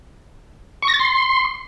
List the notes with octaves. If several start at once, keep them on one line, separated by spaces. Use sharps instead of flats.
C#6
A#6
A6
C6